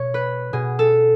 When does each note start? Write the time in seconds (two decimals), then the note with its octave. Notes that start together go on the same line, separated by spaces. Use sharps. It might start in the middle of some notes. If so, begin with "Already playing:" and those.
Already playing: B2 C#5
0.14 B4
0.53 B2 G#4
0.79 A4